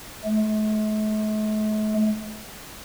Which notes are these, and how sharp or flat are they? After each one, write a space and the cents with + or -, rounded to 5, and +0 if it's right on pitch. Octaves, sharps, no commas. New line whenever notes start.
A3 -45